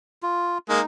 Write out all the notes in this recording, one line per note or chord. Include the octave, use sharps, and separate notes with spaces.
F4
G#3 A#3 D#4